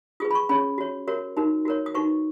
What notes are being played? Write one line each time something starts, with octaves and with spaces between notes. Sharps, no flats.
F4 G#4 B4 D#6
B5
C#6
C#4 G#4 C#5 B5
F#4 C#5
F#4 A#4 C#5
D#4 F#4 A#4
F#4 A#4 C#5
D#6
D#4 F#4 B4 C#6